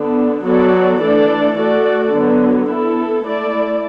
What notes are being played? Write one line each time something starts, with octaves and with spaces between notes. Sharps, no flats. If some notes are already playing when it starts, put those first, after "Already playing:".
Already playing: D3 B3 D4
F#3 B3 F#4 A4 D5
E3 A3 D4 A4 D5
A3 F#4 A4 D5
D3 F#3 B3
B3 E4 A4
A3 E4 D5